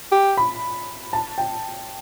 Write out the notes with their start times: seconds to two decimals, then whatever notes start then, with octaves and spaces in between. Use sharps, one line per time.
0.12 G4
0.37 B5
1.13 A5
1.38 G5